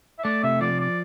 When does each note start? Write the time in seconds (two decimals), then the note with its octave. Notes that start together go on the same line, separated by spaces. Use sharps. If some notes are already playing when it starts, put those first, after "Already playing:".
0.19 E5
0.24 A3 D5
0.43 C3 E5
0.61 F3 D5
0.80 D5